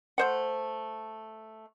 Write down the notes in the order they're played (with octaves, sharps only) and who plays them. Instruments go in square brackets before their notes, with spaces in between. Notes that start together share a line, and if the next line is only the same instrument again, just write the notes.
[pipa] A3 C5 F#5